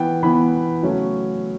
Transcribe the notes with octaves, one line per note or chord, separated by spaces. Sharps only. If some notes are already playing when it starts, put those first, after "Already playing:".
Already playing: E3 B3 G5
E3 B3 B5
C#3 F#3 A3 C#4